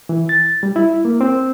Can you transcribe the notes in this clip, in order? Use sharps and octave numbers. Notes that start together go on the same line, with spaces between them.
E3
A6
G3
E4
A#3
C4